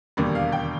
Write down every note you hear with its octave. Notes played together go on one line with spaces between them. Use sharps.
E1 D#2 D3 G3 D5
F5
G5